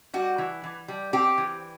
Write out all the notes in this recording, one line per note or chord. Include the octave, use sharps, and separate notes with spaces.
G3 F#4
E3
E3
G3
C4 G4
E3